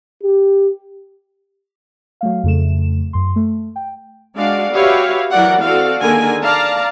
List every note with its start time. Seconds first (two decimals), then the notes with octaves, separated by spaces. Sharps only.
0.23 G4
2.21 F#3 A3 F5
2.44 F2 C#3 A3 E7
3.13 F#2 C6
3.36 A3
3.76 G5
4.36 G#3 D4 F#4 D5 F5
4.73 F#4 G4 B4 C#5 E5 F5
5.32 E3 F#3 A#4 D5 F#5
5.63 C4 F#4 A4 D5 F5
6.01 D3 D#3 A#3 G#4 A#4 G#5
6.42 D5 F5 A5 A#5